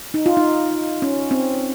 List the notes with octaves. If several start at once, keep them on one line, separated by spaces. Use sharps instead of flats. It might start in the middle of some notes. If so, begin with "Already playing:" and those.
D#4
F4
D#4
C#4
C4